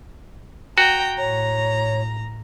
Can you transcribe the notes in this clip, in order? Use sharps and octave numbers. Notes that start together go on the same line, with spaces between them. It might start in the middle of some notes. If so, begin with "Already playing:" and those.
F#4 G5 A#5
A2 C#5 A#5